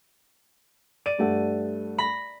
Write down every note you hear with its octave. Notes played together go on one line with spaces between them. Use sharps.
D5 D#7
G2 A3 F#5
B5 A#6